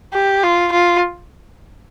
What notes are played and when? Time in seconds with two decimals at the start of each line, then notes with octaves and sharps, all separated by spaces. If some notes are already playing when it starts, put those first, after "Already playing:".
0.13 G4
0.43 F4
0.73 F4